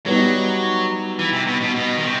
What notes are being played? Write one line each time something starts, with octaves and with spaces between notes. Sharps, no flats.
F#3 G3 B3 D#4
E3
C3
B2
B2
B2
D#3
C3